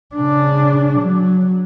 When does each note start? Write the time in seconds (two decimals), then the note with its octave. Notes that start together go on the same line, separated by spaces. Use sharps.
0.15 C#3 D4
0.99 F#3